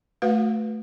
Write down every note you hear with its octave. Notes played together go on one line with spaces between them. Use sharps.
A3 F#4 B4 F5